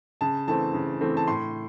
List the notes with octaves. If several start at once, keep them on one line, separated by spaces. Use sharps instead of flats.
C#3 A5
E3 A3 C4 A5
C#3
E3 A3 C4
A5
A2 C6